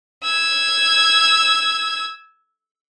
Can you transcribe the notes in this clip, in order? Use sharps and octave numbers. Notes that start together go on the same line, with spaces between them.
E6 G#6